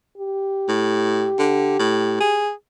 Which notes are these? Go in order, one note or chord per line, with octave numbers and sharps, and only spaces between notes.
G4
A2
D3
A2
G#4